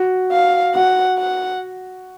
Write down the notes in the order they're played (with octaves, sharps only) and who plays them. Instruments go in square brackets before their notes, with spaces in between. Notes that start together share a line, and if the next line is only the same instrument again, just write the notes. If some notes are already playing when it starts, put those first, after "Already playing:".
Already playing: [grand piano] F#4
[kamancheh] F5
[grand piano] F#4 [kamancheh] F#5
[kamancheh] F#5